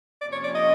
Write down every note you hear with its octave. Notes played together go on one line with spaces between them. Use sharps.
F2 C3 F3 A#3 C#4 D5
C#5
D5
D#5